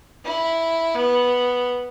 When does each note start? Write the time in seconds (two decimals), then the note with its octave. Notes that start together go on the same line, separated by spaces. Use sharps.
0.24 E4
0.95 B3